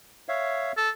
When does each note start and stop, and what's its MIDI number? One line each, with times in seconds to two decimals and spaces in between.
0.29 0.72 73
0.29 0.72 76
0.29 0.72 77
0.77 0.90 69